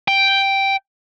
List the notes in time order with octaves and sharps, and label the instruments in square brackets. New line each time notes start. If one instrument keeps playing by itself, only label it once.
[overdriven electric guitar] G5